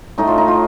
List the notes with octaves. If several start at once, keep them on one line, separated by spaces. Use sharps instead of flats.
A2 A3 D#4
F4
D#4
F4